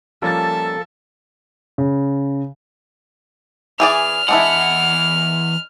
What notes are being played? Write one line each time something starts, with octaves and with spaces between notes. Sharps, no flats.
F3 G3 A#3 C#4 A4 E5 A5 A6
C#3
E3 G#4 D5 F6
E2 G#3 D4 E4 F#5